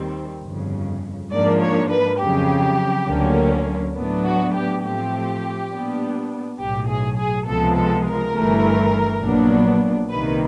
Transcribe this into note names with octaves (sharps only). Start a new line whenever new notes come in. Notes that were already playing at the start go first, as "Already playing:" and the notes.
Already playing: D#2 D#3 G3 C4
G1 F2 C#3
G#2 F3 A#3 D4 D5
C#5
B4
F2 C#3 F#3 G4
D2 D3 F#3 A#3 C#4
A2 F#3 B3 D4
F#4
G4
A2 F3 A3 C4 G4
A#2 G3 B3 D4
B1 A2 F#3 G4
G#4
G#4
C#2 C3 F3 G#3 B3 A4
A4
A#4
G1 G2 E3 A3
A#1 A#2 F#3 B3 D4
C2 C3 D#3 G3 A#3 B4